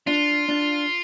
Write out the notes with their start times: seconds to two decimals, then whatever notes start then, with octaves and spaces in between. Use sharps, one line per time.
0.07 D4 F4
0.49 D4